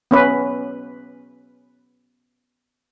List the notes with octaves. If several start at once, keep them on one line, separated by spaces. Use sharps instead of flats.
B3 C#4 B4